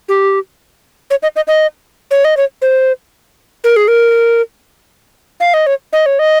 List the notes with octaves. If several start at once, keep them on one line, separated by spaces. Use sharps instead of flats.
G4
C#5
D#5
D#5
D#5
C#5
D#5
C#5
C5
A#4
G#4
A#4
F5
D#5
C#5
D#5
C#5
D#5